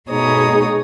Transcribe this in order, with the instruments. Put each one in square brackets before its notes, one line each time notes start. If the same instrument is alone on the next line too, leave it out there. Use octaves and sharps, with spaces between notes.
[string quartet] B2 A3 D#4 G#4 C#5 D#6